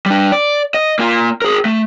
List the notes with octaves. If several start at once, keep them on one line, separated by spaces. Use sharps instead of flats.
G3 D4
D5
D#5
A#3 F4
G#4 A#4
A3